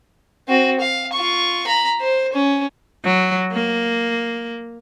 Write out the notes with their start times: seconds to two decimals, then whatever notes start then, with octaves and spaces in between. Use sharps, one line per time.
0.48 C4 F#4
0.80 F5
1.13 F4 C#6
1.67 A#5 B5
2.01 C5
2.33 C#4
3.05 F#3
3.53 A#3